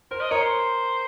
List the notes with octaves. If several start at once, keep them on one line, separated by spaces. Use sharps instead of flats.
A#4 C5
D#5
A#4 C#5
C5